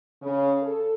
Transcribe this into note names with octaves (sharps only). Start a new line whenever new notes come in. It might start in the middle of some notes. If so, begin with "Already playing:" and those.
C#3
A4